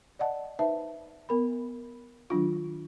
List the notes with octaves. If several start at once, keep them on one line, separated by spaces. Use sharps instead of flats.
D5 D#5 F#5 A5
D#4 B4 C5 E5 A5
B3 A#4 B5
D#3 F#3 D4 F4